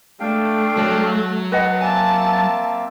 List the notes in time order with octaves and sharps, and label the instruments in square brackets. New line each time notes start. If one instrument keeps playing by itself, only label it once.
[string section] A3 [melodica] D4 F5 G5
[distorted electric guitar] F#3 [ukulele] A4 C#5
[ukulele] B4 D#5 F#5 [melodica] A5
[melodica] A#3 C4 E5 [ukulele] G#5 [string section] A5